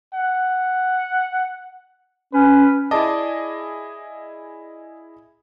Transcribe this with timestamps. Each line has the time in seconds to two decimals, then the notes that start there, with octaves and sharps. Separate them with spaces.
0.14 F#5
2.33 C#4 B4
2.91 E4 G#4 D5 D#5 A5 D6